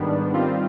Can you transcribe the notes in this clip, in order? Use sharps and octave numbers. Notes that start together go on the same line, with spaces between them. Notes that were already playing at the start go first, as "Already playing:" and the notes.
Already playing: G#2 D#3 G3 B3 D4
D#3 G3 C4 F4